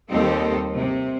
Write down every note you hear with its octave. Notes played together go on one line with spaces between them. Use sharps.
D#2 G3 C4 D#4 G4 A4
C3